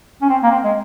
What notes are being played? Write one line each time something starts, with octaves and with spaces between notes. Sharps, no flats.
C#4
C4
A#3
C4
G#3